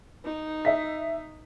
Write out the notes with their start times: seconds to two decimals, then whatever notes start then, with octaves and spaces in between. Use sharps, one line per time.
0.25 D#4
0.65 D#5 E5 B6